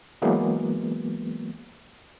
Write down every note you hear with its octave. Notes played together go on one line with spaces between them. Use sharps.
E3 F#3 G#3 A#3 B3